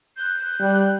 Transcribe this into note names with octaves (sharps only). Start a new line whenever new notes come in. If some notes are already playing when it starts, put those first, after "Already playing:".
F#6 G6
G3